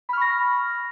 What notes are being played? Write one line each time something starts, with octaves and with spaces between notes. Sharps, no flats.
B5 C#6 F6 A#6